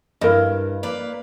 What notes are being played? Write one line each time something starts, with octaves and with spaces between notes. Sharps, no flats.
G2 E4 A#4 D#5
A#3 B4 D5